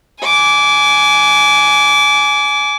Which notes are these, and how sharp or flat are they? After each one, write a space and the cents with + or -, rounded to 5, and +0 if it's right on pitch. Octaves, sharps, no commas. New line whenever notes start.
G#5 +15 D6 -20